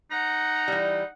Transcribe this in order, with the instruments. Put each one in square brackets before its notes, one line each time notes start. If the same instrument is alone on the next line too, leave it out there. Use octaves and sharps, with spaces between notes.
[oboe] D#4 [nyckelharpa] F#5 [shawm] A#5
[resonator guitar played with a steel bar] E3 G3